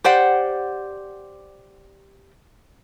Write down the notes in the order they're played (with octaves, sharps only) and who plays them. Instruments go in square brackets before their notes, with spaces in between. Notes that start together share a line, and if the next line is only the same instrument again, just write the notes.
[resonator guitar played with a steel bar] G4 C5 D5 F#5